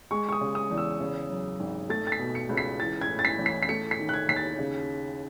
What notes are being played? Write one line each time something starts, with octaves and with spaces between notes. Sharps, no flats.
G#3 C#6
C#6
D#6
C#3
D#6
E2
E6
C#3
F#2
G#1
A3 A6
A6
B6
B2
C#7
C#2
B6
E3 A6
G#6
A2
A6
B6
A1
B6
B6
A3 C#7
B6
D#3
F#6
G#6
D#2 B6
A6
C#3